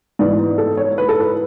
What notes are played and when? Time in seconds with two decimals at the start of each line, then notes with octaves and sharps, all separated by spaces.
0.19 G#2 E3 B3 D5
0.58 A4
0.77 C#5
0.98 B4
1.09 A4
1.20 B4